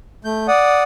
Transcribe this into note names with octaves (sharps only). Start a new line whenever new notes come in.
A3 G6
D5 F#5 D#6